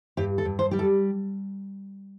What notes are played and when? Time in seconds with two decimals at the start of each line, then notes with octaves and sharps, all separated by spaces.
0.17 G2 G4
0.38 A4
0.45 G2
0.59 C5
0.71 G3 G4
0.79 A4